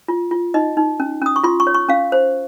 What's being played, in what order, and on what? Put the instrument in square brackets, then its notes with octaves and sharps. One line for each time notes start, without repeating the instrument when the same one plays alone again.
[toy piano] F4
F4
D#4 D#5
D#4
C#4
C#4 D#6
C#6
F4 C6
C#6
C#5
C#6
C#4 F5
C5